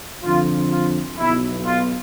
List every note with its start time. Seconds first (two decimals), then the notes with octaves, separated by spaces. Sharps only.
0.24 F2 D3 F3 F4
0.72 F4
1.18 B1 B2 E4
1.65 F4